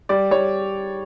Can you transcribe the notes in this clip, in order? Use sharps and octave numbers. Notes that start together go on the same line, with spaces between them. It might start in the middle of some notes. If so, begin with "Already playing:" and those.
G3 D5
G3 C#5